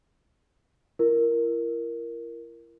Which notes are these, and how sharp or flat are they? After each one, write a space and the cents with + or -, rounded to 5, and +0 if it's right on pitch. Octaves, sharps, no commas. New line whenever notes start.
E4 +40 A#4 +0